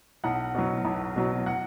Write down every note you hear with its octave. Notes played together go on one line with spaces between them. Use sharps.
B1 F#5
B2 F#3
B1
B2 F#3
F#5